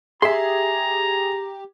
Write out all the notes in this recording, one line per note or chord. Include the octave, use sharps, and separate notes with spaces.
G4 G#4 E5 A#5 C6